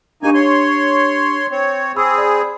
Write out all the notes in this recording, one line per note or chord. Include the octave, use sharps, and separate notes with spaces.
A#3 D4 D#4 G4 G#5 C#6
C#5 C6
C4 C#5
C4 G#4 B5 C#6 E6
D5 B5